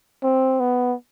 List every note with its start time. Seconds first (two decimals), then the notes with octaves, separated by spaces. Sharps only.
0.23 C4
0.60 B3